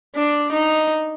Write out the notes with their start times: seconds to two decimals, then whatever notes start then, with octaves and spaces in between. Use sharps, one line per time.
0.15 D4
0.52 D#4